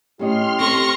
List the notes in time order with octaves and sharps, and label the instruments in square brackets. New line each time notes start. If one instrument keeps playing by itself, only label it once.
[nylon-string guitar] A2 C#4 D#5 [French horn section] G4 [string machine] C6 F6
[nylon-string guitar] C4 A4 [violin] C#6 A#6